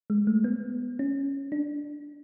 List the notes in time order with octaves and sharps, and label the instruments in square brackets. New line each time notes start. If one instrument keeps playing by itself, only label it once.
[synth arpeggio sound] G#3
A3
B3
C#4
D4